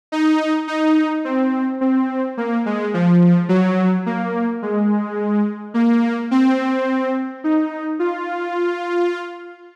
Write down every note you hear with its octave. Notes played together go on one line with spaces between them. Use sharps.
D#4
D#4
C4
C4
A#3
G#3
F3
F#3
A#3
G#3
A#3
C4
D#4
F4